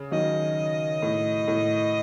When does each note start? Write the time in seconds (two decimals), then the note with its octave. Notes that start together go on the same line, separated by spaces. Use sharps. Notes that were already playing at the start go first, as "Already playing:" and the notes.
Already playing: C#3
0.11 D#3 F#3 D#5
1.02 A2
1.48 A2